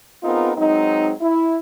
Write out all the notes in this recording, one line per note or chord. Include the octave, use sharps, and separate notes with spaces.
B3 C4 D#4 F4 G#4 A#4
F#3 G#3 C4 D#4
E4